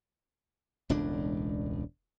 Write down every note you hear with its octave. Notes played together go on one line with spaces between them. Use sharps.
E1 C#2 A2 D4